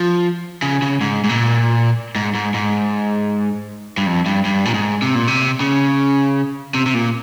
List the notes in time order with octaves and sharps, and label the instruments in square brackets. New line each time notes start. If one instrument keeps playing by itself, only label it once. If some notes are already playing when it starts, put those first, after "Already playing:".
Already playing: [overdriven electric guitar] F3
C#3
C#3
G#2
G#2
A#2
G#2
G#2
G#2
G2
F2
G2
G2
A#2
G#2
C3
A#2
C3
C#3
C3
C3
A#2